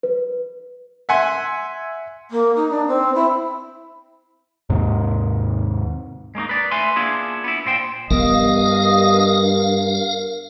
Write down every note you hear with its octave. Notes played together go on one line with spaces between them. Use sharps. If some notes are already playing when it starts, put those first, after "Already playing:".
B4
E5 F#5 G#5 C6
A#3
D#4
D4
C4
E4
D#2 G#2 C3
G#3 A#3 C#4 D#4
B4 D5
A3 B4 E5 G#5 C6
A#3 B3 D4 E4 F4 G#4
B3 E4
A#2 C5 G5
G2 B3 A#4 D#5 F5